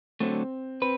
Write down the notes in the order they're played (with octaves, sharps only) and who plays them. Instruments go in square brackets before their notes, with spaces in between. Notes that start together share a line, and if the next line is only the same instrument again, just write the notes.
[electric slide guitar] D3 F#3 A3 [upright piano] C4
[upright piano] C4 [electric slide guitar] B4